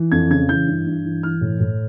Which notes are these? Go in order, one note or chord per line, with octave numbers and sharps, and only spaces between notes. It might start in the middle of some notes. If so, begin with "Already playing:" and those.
Already playing: E3
F2 G#6
C#3 G#6
E3 G6
G2
G2
E3
E3 F6
A2
A2